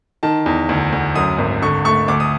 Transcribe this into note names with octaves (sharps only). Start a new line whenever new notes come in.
D#3 A5
E2
D2
D2
F#2 D#6
G#1
D3 C#6
A3 C#6
D2 D6
D#6